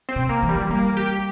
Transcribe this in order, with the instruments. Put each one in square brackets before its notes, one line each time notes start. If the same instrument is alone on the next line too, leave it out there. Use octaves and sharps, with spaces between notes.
[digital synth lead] C4
[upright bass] C3
[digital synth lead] A#3
[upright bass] E3
[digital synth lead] G3
[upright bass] F3
[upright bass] G3 [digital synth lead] A#3
[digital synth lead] G4